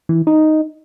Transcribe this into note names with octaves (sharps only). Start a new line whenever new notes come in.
E3
D#4